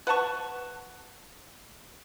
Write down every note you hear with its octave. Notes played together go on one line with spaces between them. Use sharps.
B4 F#5 A5 C#6